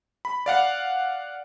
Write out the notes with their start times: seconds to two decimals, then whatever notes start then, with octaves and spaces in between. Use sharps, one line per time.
0.25 B5
0.46 D5 F5 F#5